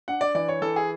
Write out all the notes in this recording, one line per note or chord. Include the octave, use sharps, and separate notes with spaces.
D4 F#5
D5
E3 D5
C#5
E3 A4
G#4